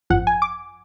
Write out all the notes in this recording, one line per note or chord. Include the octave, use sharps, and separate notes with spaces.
G#1 F#2 F3 F#5
G#5
D6